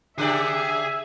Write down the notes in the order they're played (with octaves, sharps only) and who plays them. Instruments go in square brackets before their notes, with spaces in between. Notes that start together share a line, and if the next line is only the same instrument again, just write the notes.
[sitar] C#3 G4 D5 [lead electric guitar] G#4 [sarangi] E5